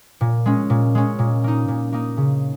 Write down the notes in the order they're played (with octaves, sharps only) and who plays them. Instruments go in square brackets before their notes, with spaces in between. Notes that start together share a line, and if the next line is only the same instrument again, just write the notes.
[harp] A#2
G#3 C#4
A#2
G#3 C#4
A#2
A#3 D#4
A#2
A#3 D#4
C#3